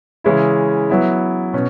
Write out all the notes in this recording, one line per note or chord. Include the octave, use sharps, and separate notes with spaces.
C#3 E3 G#3 C#4 E4
F#3 B3 E4
B2 C#4